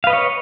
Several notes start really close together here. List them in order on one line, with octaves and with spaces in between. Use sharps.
F5 B4 D#5 C#5